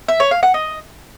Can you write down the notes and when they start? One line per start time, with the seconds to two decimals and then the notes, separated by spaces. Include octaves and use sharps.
0.08 E5
0.20 C#5
0.31 F5
0.43 F#5
0.54 D#5